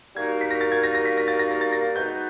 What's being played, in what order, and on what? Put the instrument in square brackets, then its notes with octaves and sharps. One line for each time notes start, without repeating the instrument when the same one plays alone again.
[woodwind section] G3 A#3 D#4 F#4 A#4 [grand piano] G#6
[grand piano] B6
A#6
A6
G#6
A#6
A#6
B6
A#6
A6
A#6
A#6
A6
A#6
[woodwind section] G#3 B3 D#4 F#4 B4 [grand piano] G6